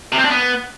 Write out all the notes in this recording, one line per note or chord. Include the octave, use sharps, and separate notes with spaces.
C3
C4
D4
B3